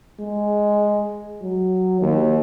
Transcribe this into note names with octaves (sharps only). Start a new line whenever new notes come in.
G#3
F#3
D#2